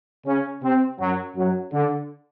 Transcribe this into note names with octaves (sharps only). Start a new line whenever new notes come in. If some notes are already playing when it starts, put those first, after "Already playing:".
C#3 C#4
C3 C4
F#2 F#3
F#2 F#3
D3